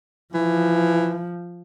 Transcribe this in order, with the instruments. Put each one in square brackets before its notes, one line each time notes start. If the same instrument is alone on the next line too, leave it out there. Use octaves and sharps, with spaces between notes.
[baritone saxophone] E3 [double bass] F3